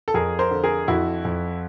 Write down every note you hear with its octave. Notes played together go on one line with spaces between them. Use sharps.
A4
F2 G#4 A#4
A#4 C5
D3
G#4 A#4
F2 E4 F#4
F2